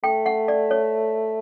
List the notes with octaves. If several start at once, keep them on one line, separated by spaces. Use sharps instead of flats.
A3 G5
F#5
D5
C#5